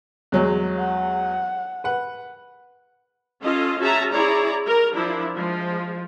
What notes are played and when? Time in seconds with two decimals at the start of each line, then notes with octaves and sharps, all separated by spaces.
0.32 E2 F#3 G#3
0.80 F#5
1.84 B4 F#5
3.43 C#4 F4 A4 D#5 F5
3.79 C#4 F#4 G#4 E5 A5 A#5
4.13 E4 G#4 C#5 D5 A#5
4.66 A#4
4.95 F3 D4 E4
5.35 F3 G#3